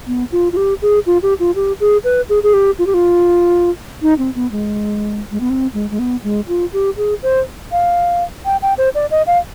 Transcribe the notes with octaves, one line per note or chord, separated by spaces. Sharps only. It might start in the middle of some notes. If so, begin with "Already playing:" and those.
B3
F4
F4
G4
G#4
F4
G4
F4
G4
G#4
B4
G#4
G#4
G4
F4
G4
F4
D#4
C4
B3
G#3
G#3
B3
C4
G#3
G#3
B3
G#3
F4
G4
G#4
C5
F5
G5
G5
C5
D5
D#5
F5